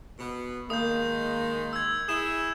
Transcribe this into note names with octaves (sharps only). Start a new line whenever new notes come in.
B2 B3
D#3 G#3 A#3 D#6 G6
E6 G#6
E4 G#4 E7